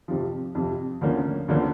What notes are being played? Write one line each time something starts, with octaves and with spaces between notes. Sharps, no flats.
F2 C3 F3
F2 C3 F3
D2 D3 F3 A#3 C#4
D2 D3 F3 A#3 C#4